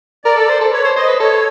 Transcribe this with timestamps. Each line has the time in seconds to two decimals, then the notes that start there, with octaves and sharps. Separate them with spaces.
0.25 A#4 D5
0.37 A4
0.49 C5
0.61 A4
0.72 B4 C#5
0.85 C5
0.96 C5 D#5
1.08 B4
1.20 A4 C#5